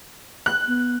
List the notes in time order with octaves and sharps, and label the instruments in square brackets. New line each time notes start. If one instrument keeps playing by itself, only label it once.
[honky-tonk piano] F#6
[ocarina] B3